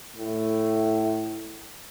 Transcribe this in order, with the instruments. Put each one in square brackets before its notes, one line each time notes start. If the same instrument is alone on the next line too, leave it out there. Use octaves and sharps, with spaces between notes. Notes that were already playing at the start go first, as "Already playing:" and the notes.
[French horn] A2